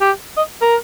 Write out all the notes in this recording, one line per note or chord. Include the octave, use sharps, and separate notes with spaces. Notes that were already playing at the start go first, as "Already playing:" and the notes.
G4
D#5
A#4